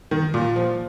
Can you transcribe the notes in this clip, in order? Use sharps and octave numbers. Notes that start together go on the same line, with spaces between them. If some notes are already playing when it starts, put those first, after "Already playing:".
D#3
A#2
F3